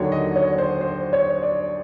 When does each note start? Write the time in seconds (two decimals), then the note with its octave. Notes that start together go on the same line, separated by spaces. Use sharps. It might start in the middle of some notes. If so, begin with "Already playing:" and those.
Already playing: D#2 D3 F#3 C#5
0.12 D#5
0.36 C#5
0.58 C5
0.81 C5
1.13 C#5
1.43 D5